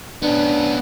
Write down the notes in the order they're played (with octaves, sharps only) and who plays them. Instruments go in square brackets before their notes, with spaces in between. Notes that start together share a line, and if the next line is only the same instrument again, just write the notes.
[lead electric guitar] B3 C#4 [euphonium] D4